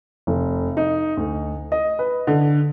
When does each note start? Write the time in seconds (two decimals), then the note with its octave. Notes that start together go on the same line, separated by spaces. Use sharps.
0.27 F1
0.77 D#4
1.17 D2
1.72 D#5
1.99 B4
2.27 D3